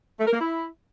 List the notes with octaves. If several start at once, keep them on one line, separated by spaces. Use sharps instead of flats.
A3
A#4
A#3
E4